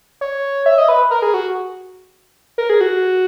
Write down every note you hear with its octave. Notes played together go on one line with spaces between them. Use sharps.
C#5
E5
D#5
B4
A#4
G#4
F#4
A#4
G#4
F#4